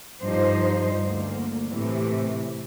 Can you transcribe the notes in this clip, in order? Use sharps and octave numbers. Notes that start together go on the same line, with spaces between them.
G2 F3 D#4 C5
D2 A#3
A2 C3 E3